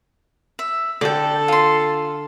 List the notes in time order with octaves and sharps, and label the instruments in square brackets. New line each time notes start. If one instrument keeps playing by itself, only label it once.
[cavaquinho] E5
[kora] D3 [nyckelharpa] A4 [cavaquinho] D5 G5
[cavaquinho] F4 C6